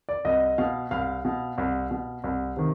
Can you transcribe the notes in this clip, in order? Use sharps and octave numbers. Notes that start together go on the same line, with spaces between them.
D5
C2 D#5
B2 F5
C2 F5
B2
C2
B2
C2
C3 D#3